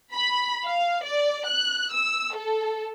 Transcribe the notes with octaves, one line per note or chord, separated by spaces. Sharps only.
B5
F5
D5
F#6
E6
A4